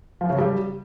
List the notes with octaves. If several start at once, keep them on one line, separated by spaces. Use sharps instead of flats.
F3
C#3
G3